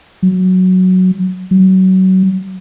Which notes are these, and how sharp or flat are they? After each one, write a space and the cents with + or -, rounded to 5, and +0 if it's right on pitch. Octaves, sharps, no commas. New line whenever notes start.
F#3 +0
F#3 +25